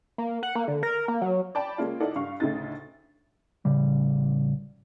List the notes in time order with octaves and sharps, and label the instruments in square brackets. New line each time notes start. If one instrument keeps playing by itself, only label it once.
[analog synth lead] A#3
F#5
A#3
D3
A#4
A#3
F#3
[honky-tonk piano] D5 G5 A5 B5
G#3 A#3 C#4 F4
D#4 E4 A4 D5 F#5
G2 F5 C#6
D2 A2 C#3 D#4 A6
[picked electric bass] A1 C#3 G3